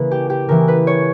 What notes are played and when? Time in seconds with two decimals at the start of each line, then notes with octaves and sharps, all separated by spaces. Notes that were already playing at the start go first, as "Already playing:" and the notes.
Already playing: C#3 E3 A#3 B4
0.11 G4
0.30 G4
0.49 C#3 E3 A#3 A#4
0.68 B4
0.87 C#5